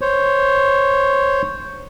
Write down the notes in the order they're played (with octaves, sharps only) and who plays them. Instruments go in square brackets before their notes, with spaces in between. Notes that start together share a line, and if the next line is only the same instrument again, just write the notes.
[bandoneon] C5 C#5